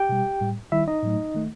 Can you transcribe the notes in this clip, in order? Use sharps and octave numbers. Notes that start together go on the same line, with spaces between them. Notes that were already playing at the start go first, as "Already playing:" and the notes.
Already playing: G4 G5
B2 G3
A2 G3
D#3 G3 E4 E5
D#4 D#5
A2 F#3 A3
D#3 A3